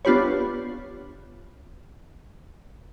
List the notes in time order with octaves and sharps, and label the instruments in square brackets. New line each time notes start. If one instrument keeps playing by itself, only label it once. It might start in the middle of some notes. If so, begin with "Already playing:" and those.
[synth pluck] B3 D4 F4 G4 B4 C#5